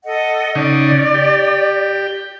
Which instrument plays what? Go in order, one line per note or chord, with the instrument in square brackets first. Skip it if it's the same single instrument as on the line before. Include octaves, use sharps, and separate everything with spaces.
[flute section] A4 D#5 F#5
[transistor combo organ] C#3 D#4 [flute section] D5
[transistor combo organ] G4